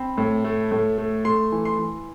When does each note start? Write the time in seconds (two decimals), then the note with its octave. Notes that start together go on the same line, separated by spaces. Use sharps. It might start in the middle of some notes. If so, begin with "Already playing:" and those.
Already playing: C4 B5
0.18 A2
0.44 A3
0.72 A2
0.98 A3
1.25 A3 C6
1.52 E3
1.65 C6
1.79 E3